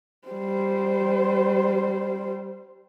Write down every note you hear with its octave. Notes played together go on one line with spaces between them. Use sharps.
G3 C5